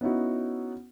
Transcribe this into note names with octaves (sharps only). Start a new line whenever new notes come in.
B3 C#4 D#4 E4 F#4